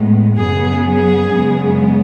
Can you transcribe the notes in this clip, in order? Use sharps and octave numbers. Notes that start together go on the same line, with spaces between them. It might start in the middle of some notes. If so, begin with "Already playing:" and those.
Already playing: A2 G#3 B3
F#2 C#3 F#3 B3 G#4
G#4
F#2 C#3 G#3 B3